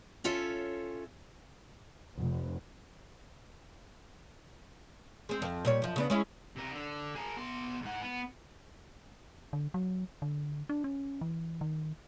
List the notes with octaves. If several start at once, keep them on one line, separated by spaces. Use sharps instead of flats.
C#4 F4 A4 C#5 E5
F1
G#3 C4
F2
A#2 G3 C#5
F#2 F3
C#3 B3 D4
G#3 C#4 E4
C3 A#4
D3
G#4 A#4
B2 C6
G#2 F#5
B3
D3
F#3
D3
D4
C#4
E3
D#3